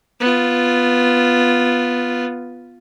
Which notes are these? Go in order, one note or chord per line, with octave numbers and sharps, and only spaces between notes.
B3 F4